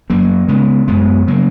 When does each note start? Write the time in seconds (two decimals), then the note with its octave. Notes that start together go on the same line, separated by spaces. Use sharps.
0.09 F#2 F#3 A#3
0.48 C#3 G#3 B3
0.88 F#2 G#3 B3
1.27 C#3 F#3 A#3